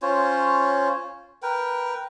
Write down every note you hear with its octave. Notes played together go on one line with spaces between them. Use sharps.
C#4 F4 C5 C#5
A#4 B4 G5